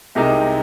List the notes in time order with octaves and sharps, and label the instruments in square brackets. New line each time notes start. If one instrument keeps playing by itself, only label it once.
[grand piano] C2 C3 G#3 D#4 A#4